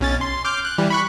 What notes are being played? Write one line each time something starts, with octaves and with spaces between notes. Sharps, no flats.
B1 C#4 A6
C6
D6 F6 G6
F#6
E3 G3
B5 C#6 F#6